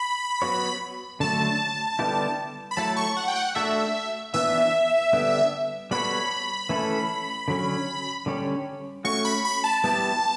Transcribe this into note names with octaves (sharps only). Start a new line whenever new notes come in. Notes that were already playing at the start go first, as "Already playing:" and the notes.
Already playing: B5
F#3 B3 F#4 C#5
D3 F#3 A3 A5
D3 G3 B3 E4 G4
B5
F#3 A3 E4 A4 A5
C#6
F#5
G5
F#5
A3 D4 F#4 A4 E5
E3 B3 D4 E5
D3 G3 B3
G3 B3 F#4 A4 C#5 B5
E3 A3 C#4 E4 A4
D3 F#3 C#4
D3 G3 C#4 G4 C#5
A3 C#4 F#4 C#6
B5
B5
A5
G3 B3 E4 G4 A5